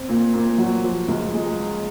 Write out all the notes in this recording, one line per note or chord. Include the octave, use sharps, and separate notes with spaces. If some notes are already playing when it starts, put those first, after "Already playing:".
Already playing: C4
A#2
A#2
F#3
F3
C#2
G#3